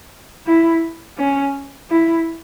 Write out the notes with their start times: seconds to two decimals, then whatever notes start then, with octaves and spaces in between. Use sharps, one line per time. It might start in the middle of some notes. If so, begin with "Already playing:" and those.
0.46 E4
1.18 C#4
1.90 E4